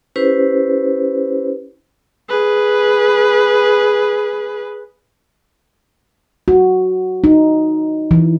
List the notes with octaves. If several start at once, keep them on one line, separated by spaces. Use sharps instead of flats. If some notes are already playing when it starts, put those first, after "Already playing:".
C#4 E4 G4 B4 C5
G#4 B4
F#4
D#4
E3